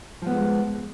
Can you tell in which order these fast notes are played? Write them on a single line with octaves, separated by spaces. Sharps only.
F3 B3 A3 G#3